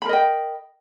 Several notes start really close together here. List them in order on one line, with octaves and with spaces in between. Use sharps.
B5 A#4 D#5 G5